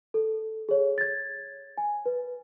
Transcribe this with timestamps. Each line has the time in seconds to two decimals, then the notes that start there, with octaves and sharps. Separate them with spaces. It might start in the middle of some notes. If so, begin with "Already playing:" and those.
0.14 A4
0.69 G#4 C#5
0.98 G#6 A6
1.78 G#5
2.06 B4